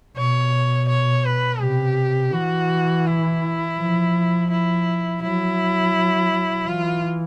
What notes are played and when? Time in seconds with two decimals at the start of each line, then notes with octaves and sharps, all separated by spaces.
0.17 B2 C#5
0.89 C#5
1.25 B4
1.61 C3 G4
2.33 E3 F#4
3.06 E4
3.78 F3
4.51 E4
5.22 F#3 E4
6.67 E3 F4